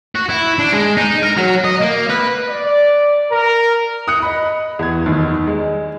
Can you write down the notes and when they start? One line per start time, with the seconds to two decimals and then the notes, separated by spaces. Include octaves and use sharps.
0.15 F#4
0.29 E4
0.59 D4
0.73 G#3
0.97 D#4
1.23 A#4
1.38 F#3
1.65 D#5
1.81 A#3
2.10 B4
2.48 D5
3.30 A#4
4.08 D#6 F#6 C#7
4.22 D#5 B5
4.79 E2 G#6
5.06 D#2
5.47 G#3